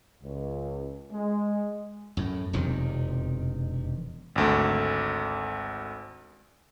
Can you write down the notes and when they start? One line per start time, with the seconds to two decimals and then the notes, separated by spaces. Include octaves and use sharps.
0.22 C#2
1.12 G#3
2.17 F#2 A2
2.53 E1 F2 C3 D#3
4.36 G#1 D2 A3